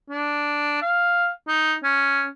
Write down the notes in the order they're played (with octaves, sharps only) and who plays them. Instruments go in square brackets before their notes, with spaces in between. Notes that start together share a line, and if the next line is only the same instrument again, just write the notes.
[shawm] D4
F5
D#4
C#4